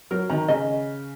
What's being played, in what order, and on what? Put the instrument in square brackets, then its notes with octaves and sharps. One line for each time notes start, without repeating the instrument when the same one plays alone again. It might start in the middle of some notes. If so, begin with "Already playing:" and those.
[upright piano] F#3 [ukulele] A#4
[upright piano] D#3 [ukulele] A#5
[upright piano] C#3 [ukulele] D#5